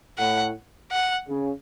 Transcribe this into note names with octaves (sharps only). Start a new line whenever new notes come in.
A2 F#5
F#5
C#3